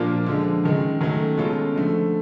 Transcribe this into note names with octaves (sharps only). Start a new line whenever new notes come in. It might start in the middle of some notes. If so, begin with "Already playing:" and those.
Already playing: A#2 F3 A#3 D4 F4
D3 F3 G#3
F#2 D#3 G#3
D#3 F#3 A3 C#4
B2 G#3 C#4 F4 A4
D3 F3 A3